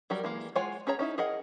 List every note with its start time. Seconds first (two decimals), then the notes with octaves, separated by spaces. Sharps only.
0.10 F#3 G3 A#4
0.24 E3 G#3 A#3
0.56 G#3 F4 C#5 F#5 G#5
0.87 C#4 G#4 C#5 A#5
0.99 C#4 D#4 E4
1.18 G#4 A#4 D#5 F#5